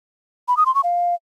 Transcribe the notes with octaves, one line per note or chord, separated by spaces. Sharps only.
B5
D#6
C6
C#6
F5